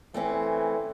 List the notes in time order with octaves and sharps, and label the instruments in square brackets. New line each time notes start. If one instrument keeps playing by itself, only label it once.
[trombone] E3 [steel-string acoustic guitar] A3 C4 C#4